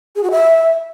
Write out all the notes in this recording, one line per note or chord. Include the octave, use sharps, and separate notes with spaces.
G#4
F#4
E5